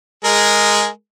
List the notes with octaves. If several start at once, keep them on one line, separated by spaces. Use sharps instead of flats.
G#3 G#4 A#4